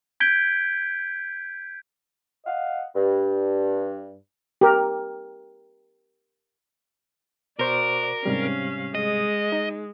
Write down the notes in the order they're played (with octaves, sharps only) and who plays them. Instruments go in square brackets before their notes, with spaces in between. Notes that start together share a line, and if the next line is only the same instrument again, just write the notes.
[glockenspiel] G6 G#6 B6 D7 G7
[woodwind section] D#5 F5 F#5
G2
[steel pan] G4 A#4
[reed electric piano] B2 C5 C#6 [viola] F#4 D5 [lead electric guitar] A#4
[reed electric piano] G#2 C3 G3 [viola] C#4 F5
[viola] G#3 [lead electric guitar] D#5
[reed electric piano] D#4